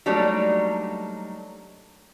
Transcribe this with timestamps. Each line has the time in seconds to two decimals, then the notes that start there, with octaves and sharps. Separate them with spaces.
0.06 F#3 G3 A3 A#3 D4 D#4